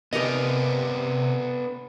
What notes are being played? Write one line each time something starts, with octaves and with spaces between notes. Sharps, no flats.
C3 B3 D4 G4 A#4 D#5